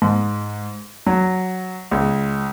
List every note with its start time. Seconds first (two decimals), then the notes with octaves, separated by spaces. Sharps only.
0.02 G#2
1.07 F#3
1.91 C#2